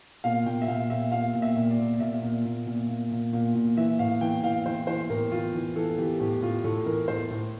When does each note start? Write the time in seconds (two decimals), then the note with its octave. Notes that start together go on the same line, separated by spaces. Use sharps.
0.24 A#2 F5
0.46 A#2 G5
0.62 E5
0.68 A#2 F5
0.90 A#2 E5
1.12 A#2 F5
1.35 A#2
1.42 E5
1.56 A#2
1.71 D5
1.79 A#2
2.00 A#2 E5
2.23 A#2
2.45 A#2
2.67 A#2
2.89 A#2
3.12 A#2
3.33 A#2
3.55 A#2
3.77 E3 E5
3.99 A2 F5
4.21 E3 G5
4.43 E3 F5
4.66 E3 C5
4.87 E3 C5
5.10 A2 A#4
5.31 E3 F4
5.54 E3
5.76 E3 A4
5.98 E3 G4
6.20 A2 G4
6.42 A2 F4
6.64 A2 A4
6.86 E3 A#4
7.08 A2 C5
7.31 A2